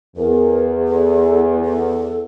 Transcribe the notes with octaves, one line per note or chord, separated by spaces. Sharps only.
E2 A#4
A4
A4